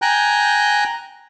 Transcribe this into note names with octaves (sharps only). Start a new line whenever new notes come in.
G5 G#5 A#5 F#6 G6